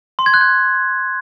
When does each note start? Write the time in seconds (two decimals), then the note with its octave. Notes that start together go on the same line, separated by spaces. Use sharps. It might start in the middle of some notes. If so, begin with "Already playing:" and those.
0.19 C6
0.26 G#6
0.34 F#6
0.41 G6